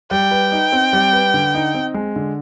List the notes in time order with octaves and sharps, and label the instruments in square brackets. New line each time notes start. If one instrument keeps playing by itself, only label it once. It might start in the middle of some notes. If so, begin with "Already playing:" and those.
[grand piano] G3 [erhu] G5
[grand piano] B4
D#4
C4
G3
B4
D3
D#4
C4
G#3
D3